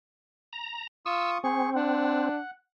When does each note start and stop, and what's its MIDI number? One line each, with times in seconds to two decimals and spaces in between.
0.53 0.87 82
1.06 1.38 65
1.06 1.38 85
1.06 1.38 87
1.06 1.31 88
1.44 2.29 60
1.44 1.70 68
1.44 1.70 85
1.75 2.39 62
1.75 2.51 78